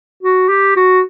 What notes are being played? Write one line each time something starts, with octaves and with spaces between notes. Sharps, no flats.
F#4
G4
F#4